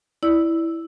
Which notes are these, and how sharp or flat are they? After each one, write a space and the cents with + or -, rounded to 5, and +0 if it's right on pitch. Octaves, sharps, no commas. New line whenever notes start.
E4 +0 D5 +0 E6 +0